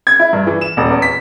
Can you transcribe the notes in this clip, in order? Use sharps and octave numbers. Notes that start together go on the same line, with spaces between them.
G#6
E4
G2
E3
E7
D#1
E2
B6